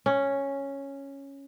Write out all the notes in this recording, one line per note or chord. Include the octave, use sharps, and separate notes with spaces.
C#4